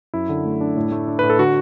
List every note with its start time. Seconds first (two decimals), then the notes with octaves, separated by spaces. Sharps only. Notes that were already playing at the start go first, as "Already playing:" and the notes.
0.14 F#2 E4
0.29 D3
0.45 A3
0.61 D4
0.77 A2
0.92 A3
1.08 D4
1.19 A2 B4
1.30 A4
1.39 D3 F#4